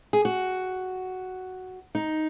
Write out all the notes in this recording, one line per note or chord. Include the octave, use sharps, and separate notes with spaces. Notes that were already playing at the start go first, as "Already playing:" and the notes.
G#4
F#4
D#4